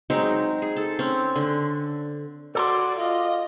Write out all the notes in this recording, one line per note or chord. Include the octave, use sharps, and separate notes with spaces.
F#3 G#3 C4 D#4
G#4
A4
C4 C#4
D3
F#4 A4 D5 A#5 C6
F4 D#5